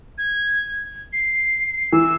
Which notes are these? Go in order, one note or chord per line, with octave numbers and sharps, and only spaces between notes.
G#6
C7
E3 E6